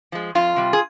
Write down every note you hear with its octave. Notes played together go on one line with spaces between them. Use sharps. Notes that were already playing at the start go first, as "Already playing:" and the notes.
F3 G#3
F2 F4
C3 G3
G#4